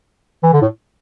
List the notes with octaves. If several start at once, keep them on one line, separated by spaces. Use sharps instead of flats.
E3
D3
A2